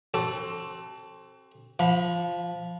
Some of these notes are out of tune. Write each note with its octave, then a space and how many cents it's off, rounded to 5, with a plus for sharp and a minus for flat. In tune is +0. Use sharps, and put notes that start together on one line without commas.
C4 +25 F#4 +40 A4 +0
F3 +0 F#5 -45 B5 +0